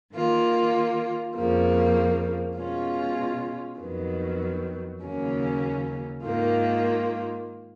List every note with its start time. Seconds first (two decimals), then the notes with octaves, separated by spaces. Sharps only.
0.13 D#3 A#3 F4
1.35 F2 C#3 F3 A#3
2.57 B2 G#3 C#4 F4
3.79 F2 D#3 F#3 B3
5.01 D#2 C#3 F#3 A#3 C#4
6.23 G#2 D#3 A#3 F4